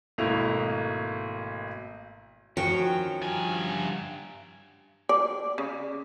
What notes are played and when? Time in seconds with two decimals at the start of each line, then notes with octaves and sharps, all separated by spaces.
0.18 G#1 B2 A3 A#3 E4 F7
2.57 D#3 F3 C#4 F#4 G5
3.22 G2 G#5
5.09 D5
5.58 C#3